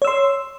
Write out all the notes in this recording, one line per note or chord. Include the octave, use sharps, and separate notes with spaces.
C#5 C6 E6